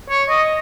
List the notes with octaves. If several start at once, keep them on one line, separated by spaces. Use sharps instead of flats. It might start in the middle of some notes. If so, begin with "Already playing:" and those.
C#5
D#5